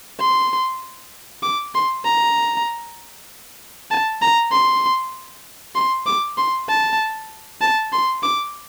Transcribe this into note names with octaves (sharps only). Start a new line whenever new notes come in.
C6
D6
C6
A#5
A5
A#5
C6
C6
D6
C6
A5
A5
C6
D6